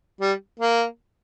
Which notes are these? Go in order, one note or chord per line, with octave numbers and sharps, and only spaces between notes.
G3
A#3